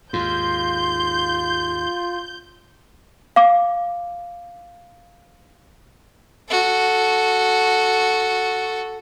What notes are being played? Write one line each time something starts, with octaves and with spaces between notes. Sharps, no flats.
D#2 G#2 F4 C6 G6
F5 D6
F#4 A4